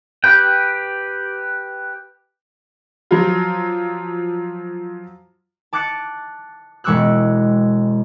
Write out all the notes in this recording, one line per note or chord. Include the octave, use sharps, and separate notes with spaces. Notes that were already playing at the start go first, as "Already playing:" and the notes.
G4 B4 G5
F3 F#3 F4
A5 D6 F#6 A6 C#7
E1 G#3 C#6 D6 E6 F#6